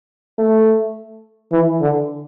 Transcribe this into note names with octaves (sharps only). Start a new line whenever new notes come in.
A3
E3
D3